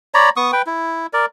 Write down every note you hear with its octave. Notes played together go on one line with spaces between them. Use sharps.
C#5 D5 A#5 B5
B3 C#6 D#6
B4 G5
E4
A#4 D5